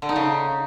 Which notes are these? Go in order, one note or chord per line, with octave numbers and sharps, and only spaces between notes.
D3
D#4
C#3